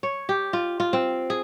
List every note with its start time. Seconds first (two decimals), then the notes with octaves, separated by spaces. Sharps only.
0.03 C#5
0.29 G4
0.53 F4
0.80 F4
0.93 C4
1.30 G#4